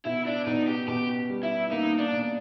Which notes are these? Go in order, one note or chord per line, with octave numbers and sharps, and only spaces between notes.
B2 E4
D4
B2 D#4
G4
B2 G4
G3
E4
A#3 D#4
D4
B2